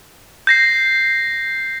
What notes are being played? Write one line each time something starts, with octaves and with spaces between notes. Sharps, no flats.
G6 A#6 C7